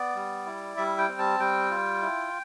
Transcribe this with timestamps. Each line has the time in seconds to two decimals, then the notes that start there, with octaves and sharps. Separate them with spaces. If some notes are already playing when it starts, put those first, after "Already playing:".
Already playing: B3 D5
0.15 G3
0.46 E4
0.77 G3 E5
0.98 G5
1.08 C4
1.19 A5
1.39 G3 G5
1.71 F4
2.02 E4